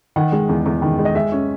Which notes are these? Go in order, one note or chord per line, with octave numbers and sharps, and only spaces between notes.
D#3 F#5
G#3
E2
E2
D#3
G#3
D#5
G#3 E5
C#4